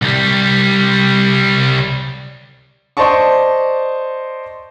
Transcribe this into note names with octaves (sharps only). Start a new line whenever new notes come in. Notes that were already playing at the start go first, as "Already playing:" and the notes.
C2 G3
C5 D5 D#5 A5 C#6